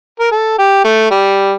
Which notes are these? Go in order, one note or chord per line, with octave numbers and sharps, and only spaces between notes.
A#4
A4
G4
A3
G3